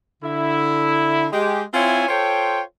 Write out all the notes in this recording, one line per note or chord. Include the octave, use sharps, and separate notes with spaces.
D3 E4
G#3 G4
C4 E4 F4 C#5 E5 G#5
F4 A4 C5 C#5 G5